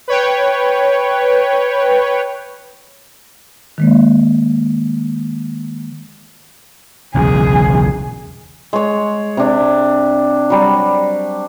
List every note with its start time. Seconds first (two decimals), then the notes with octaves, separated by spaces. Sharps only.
0.08 B4 C#5 G5
3.78 D#3 G#3 A#3
7.15 B1 E2 C#3 G#4
8.73 G#3 C#5
9.37 C3 D4
10.50 F#3 G3